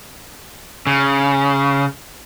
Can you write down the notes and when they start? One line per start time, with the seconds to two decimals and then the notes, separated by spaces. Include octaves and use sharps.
0.87 C#3